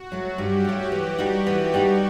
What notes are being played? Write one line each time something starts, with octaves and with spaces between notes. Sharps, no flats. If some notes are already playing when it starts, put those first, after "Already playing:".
Already playing: F#4
F#3 A3
G2 G4
F#3 A3
E3
G3 D#4 F#4
E3
G3 D#4 F#4